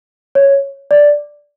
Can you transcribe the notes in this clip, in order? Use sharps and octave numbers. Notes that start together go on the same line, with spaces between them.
C#5
D5